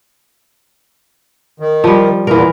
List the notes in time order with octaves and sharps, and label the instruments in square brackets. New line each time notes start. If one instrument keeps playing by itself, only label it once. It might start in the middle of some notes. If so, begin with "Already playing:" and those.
[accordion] D#3
[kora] F3 G3
[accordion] E2 A#2 [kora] E3 A#4